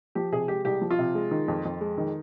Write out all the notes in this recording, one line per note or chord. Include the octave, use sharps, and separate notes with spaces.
F3 G4
C3 G#4
G#3 G4
C2 G4
F3
F4
C3
G#3
D#3
F2
F2
G#3
D#3